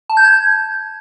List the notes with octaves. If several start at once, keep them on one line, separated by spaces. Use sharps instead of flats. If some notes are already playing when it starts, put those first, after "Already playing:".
A5
G6
G#6